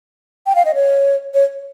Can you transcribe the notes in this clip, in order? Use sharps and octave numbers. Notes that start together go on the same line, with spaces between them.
G5
F5
D#5
C#5
C#5